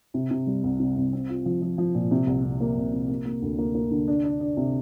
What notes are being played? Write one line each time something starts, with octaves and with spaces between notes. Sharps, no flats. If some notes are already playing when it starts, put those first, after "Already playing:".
C3
C3
G3
C2
C3
C2
C4
F4
F3
F3
F3
A#2
C3
C2
C2
A#3
C2
C3
A#3
A#3
D2
A#3
A#3
D3
D4
D4
D4
C3